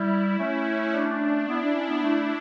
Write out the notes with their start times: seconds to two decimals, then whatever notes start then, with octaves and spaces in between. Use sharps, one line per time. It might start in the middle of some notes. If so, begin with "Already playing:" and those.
Already playing: G3 E4
0.39 A3 C#4
0.93 D4
1.48 B3 E4
1.62 D4
1.75 C#4
1.89 B3
2.03 A3